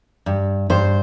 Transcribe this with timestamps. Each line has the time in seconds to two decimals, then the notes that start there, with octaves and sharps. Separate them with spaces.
0.26 G2
0.70 G2 C5